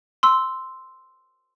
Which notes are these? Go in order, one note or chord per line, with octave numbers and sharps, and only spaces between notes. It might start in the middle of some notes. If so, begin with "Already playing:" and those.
C6 E6